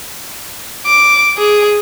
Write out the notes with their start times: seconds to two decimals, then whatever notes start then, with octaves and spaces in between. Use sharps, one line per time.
0.87 D6
1.38 G#4